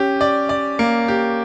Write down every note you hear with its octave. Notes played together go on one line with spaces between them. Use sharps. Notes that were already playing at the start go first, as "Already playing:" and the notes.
Already playing: C#4 G4
D5
D5
A#3
G4